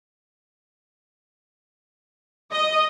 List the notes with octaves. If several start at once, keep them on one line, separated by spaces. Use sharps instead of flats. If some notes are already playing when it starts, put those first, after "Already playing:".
D#5